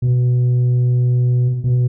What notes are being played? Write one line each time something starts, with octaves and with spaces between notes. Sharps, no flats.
B2
B2